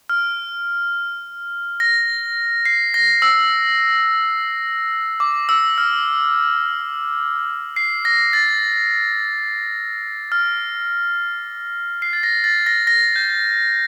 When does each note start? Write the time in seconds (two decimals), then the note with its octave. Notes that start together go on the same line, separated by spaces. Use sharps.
0.09 F6
1.80 A#6
2.65 C7
2.94 A#6
3.22 E6
5.20 D6
5.49 E6
5.78 F6
7.76 C7
8.05 A#6
8.33 A6
10.32 F6
12.02 C7
12.13 A6
12.23 A#6
12.44 A6
12.66 A#6
12.87 A#6
13.16 G6